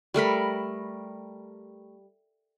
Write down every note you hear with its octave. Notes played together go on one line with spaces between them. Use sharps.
G3 A3 A#4 B5